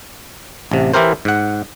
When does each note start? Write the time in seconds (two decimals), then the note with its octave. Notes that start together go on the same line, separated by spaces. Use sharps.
0.71 A1 C3
0.94 E3 E4 G4 A#4 C5
1.25 G#2 F#5